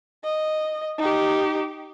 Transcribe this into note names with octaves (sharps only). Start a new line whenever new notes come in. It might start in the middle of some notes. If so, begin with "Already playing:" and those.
D#5
D#4 G4